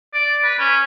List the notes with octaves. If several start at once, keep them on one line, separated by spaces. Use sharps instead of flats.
D5
B4
C#4